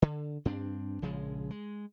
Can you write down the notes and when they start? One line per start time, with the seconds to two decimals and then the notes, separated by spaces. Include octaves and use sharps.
0.02 D3
0.45 G2 C4 D4
1.02 A#1 C#3 F3 G#3
1.51 G#3